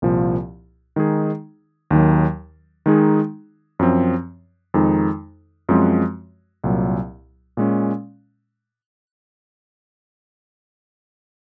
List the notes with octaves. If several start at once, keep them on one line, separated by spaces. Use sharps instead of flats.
C2 A#2 F3
D#3 G#3 D#4 G#4
D#2 D#3 F#3
D#3 G#3 D#4 G#4
F#2 F3 C4
F2 D#3 G#3 D#4
F#2 F3 G#3 C4 F#4
C2 A#2 F#3
A#2 G#3 C#4